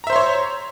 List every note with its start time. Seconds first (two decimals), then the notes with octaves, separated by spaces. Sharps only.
0.04 A#5
0.07 E5
0.10 C5
0.13 C6
0.16 C#5